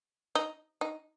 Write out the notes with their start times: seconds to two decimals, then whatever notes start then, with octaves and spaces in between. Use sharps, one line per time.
0.35 D#4
0.81 D#4